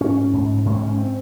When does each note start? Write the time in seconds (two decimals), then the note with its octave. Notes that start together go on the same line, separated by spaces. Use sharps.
0.01 G#2 C#4
0.33 G#2
0.66 G#2 C#4
0.74 C4
0.81 C#4
0.98 C4